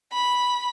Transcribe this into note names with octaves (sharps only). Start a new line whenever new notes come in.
B5